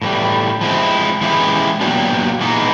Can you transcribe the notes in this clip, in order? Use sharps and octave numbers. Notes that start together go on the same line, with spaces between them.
A2 E3 G3
F3 G#3 C4 E4
E3 G#3 C#4 E4 G4
A#2 F#3 B3 D4 G4
E3 G#3 B3 D#4